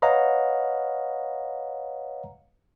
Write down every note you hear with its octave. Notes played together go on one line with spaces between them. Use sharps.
B4 C#5 D#5 F5 F#5 A#5